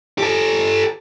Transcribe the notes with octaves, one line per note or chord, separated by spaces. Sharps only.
G4 A4